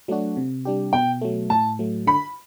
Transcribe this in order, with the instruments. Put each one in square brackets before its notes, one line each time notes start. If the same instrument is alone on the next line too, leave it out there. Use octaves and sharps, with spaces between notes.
[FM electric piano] F#3 A3 D4 F#4
C3
G3 D4 G4
[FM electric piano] B2 [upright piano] G5
[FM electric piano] F#3 A3
[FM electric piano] A2 [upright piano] A5
[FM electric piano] F#3 A3
[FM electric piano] D3 [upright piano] B5